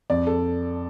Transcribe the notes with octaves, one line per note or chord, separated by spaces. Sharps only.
F2 D5
A4